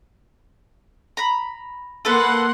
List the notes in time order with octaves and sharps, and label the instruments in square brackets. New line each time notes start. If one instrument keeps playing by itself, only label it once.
[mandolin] A#5 B5
[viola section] A#3 F#5 C6 [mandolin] A4 B4